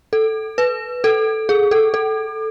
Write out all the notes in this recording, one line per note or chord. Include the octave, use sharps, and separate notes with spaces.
A4
B4
A4
G#4
A4
A4